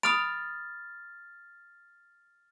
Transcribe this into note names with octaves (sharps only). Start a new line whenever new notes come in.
B5 D#6 F6 A6 D7 F7